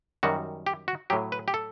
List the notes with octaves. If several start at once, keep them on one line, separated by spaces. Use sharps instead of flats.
F#2 D#3 G3 F#4
G4
F#4
A2 F#3 G4
B4
G4
A4